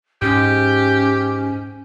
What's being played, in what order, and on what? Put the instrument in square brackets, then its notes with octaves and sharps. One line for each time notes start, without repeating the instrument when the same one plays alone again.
[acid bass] G#2 [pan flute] C#4 [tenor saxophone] G4